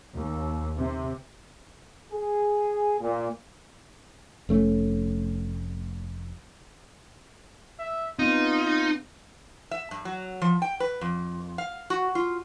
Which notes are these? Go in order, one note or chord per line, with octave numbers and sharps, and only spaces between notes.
D#2
C3
G#4
A#2
F1 A3 C#4
E5
B3 C4 D#4 F4
E5
G2
F#3
F3
G5
B4
F2
F5
F#4
F4